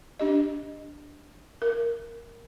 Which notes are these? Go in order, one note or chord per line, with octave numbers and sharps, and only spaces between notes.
D4 G4 D#5
A#4